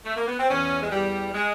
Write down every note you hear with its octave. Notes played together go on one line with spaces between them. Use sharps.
A3
A#3
B3
C4
E2 C#4
G#3
E2 G3
G#3